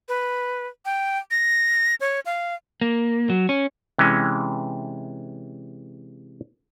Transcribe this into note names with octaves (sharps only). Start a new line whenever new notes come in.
B4
G5
A#6
C#5
F5
A#3
F#3
C#4
C3 E3 G#3 C#4